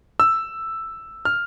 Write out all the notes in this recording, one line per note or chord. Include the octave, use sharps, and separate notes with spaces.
E6
F6